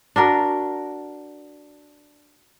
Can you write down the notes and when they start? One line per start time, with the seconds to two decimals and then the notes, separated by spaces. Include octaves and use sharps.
0.16 D4 F#4 A#4